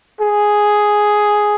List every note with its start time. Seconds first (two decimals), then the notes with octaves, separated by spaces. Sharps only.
0.21 G#4